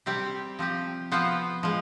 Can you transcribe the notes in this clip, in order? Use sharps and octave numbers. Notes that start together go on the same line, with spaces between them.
C3 G3 C4 G4
F3 C4 G4
F3 B3 F4 C5
F3 G#3